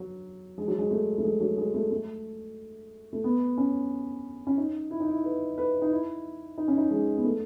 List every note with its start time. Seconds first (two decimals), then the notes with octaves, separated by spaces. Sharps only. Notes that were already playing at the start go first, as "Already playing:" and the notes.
Already playing: F#3
0.58 G#3
0.68 F#3
0.78 G#3
0.91 A3
1.18 A3
1.24 G#3
1.41 F#3
1.58 G#3
1.74 A3
1.91 A3
3.13 A3
3.24 B3
3.58 C#4
4.47 C#4
4.57 D#4
4.91 E4
5.00 D#4
5.09 E4
5.24 B4
5.58 B4
5.82 D#4
5.91 E4
6.58 D#4
6.68 C#4
6.78 D#4
6.91 G#3
7.17 B3
7.24 A3